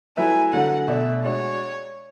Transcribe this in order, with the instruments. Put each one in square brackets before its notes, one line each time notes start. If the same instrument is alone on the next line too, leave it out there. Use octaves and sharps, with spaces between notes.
[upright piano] F#3 A3 E4 B4 E5 [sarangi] G#5
[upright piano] D3 F#3 A3 [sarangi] F#5
[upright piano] B2 A3 D4 [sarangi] E5
[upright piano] G#3 D4 F#4 [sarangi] C#5